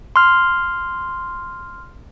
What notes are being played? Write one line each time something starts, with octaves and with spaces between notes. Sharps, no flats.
C6 F6